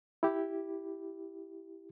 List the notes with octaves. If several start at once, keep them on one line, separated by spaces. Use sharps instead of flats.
E4 G4